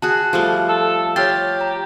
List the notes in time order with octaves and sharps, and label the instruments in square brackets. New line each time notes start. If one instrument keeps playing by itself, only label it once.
[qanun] F#4 G#4 [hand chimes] A5 F#6
[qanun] F3 G3 A3
[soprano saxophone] A4
[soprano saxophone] G4 [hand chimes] C#5 F6 A6 [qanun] C6
[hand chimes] A#5